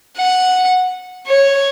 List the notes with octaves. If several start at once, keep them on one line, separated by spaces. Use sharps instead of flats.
F#5
C#5